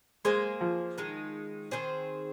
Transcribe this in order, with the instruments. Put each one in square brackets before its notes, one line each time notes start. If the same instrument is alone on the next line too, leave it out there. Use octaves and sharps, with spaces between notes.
[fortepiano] G#3 [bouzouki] A#3 G#4 C5
[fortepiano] F3
[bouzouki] D#3 G#3 D#4
D#3 C4 G#4 C5